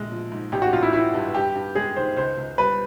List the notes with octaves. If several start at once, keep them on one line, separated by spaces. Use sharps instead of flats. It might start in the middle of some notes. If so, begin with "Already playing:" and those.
Already playing: A#1 G#3
F3
G#2
A1 G4
F#4
A1 F4
E4
E3 E4
G2
G2 G4
G2
G#3 G#4
D#3 C5
C#2 C5
C#2
G3 B4